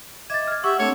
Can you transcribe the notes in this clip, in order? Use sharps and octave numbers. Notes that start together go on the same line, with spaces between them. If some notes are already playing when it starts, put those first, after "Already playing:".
D#5 E5 D6 G#6 A6
F6 G#6
G4 E5 F#5 C#6
A3 C4 D4 C#5